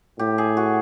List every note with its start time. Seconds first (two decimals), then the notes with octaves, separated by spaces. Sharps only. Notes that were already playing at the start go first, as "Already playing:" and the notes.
0.19 A2 G4
0.38 G#4
0.57 F#4